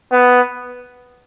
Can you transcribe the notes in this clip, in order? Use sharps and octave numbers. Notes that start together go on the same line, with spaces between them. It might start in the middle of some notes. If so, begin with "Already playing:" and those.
B3